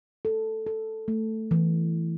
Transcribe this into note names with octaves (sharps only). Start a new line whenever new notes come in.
A4
A4
A3
E3